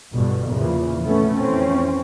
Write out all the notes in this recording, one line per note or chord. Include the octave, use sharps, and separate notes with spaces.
G1 G2 B2
E2 A#2 C#3 E3 F3
B2 A3 B3 C#4
F2 E3 C4 C#4